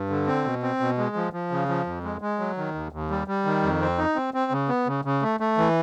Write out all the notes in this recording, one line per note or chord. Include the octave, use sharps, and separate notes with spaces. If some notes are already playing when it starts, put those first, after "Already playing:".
Already playing: G2
D3
C4
B2
C4
B2
G#3
F3
F3
C#3
F3
F2
G#3
G#3
F#3
D#3
D#2
D#2
G3
G3
D#3
F2
C4
D#4
C4
C4
C#3
B3
C#3
C#3
A3
A3
E3